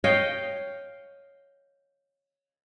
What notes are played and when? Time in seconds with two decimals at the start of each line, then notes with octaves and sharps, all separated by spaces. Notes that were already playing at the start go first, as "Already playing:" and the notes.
0.04 C#5 D#5 F5 G5